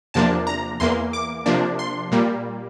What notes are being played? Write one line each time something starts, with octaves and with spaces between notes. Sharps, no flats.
E2 C3 F3 A#3 D4 A5
A#5
E2 E3 A#3 C6
D6
C3 F3 A#3 D4
C6
A#2 G3 A#3